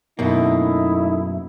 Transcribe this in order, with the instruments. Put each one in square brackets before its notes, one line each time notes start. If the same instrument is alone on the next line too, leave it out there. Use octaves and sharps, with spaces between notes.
[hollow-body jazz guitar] F#2 B2 A#3 [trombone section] A3 D#4 E4